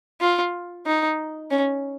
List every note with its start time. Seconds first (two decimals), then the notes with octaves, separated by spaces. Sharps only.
0.21 F4
0.86 D#4
1.51 C#4